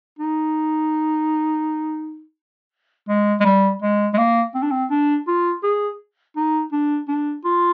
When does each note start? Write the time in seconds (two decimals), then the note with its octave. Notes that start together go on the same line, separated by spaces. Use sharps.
0.19 D#4
3.09 G#3
3.40 G#3
3.45 G3
3.82 G#3
4.13 G#3
4.18 A#3
4.55 C4
4.62 D4
4.71 C4
4.91 D4
5.27 F4
5.63 G#4
6.36 D#4
6.72 D4
7.08 D4
7.45 F4